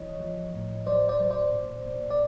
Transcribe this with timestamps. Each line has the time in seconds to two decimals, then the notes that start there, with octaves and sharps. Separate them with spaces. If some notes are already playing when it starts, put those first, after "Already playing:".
Already playing: E3 C#5 D#5
0.20 F3
0.53 A2
0.86 F#3 C5 D5
1.09 C5 D5
1.20 F#3
1.30 C5 D5
1.53 A#2
1.87 A#2
2.10 D5